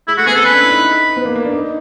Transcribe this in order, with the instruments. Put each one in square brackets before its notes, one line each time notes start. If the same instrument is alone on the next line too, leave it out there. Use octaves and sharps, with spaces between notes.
[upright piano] G#3 [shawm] E4
[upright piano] A3 [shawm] F#4
[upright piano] B3 [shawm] G#4
[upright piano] C4 [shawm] A4
[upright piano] C#4 [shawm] B4
[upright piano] D4
E4
D#4
B3
A#3
A#3
D4
D#4